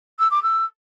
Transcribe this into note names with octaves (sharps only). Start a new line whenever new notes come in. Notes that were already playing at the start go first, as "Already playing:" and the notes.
E6
D6
E6